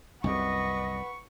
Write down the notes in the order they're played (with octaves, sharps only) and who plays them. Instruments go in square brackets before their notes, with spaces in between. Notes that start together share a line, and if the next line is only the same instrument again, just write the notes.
[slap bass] C2 F#2 C3 [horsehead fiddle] B4 F#5 [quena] D#5 [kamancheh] C#6